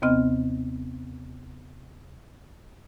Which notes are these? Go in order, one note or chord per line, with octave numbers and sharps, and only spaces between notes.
D#2 C3 B3 C4 D#5 F6